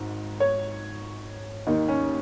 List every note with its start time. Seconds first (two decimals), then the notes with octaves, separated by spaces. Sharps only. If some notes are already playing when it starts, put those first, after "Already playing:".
Already playing: G#1 G#2
0.40 C#5
1.67 D#2 D#3 D#4
1.88 C#4